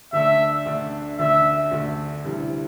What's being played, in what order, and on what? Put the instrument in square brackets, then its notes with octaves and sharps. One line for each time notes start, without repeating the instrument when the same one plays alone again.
[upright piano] D2 D3 A3 D4 [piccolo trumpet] E5
[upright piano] D2 D3 A3 D4
[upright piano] D2 D3 A3 D4 [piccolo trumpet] E5
[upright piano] D2 D3 A3 D4
D2 C3 E3 G3 E4